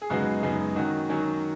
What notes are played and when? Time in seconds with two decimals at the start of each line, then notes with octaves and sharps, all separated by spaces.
0.02 G#4
0.10 F#2 C#3 G#3 B3 D#4 F#4
0.43 F#2 C#3 G#3 B3 D#4
0.76 D#3 F#3 C#4 F#4
1.09 D#3 F#3 C#4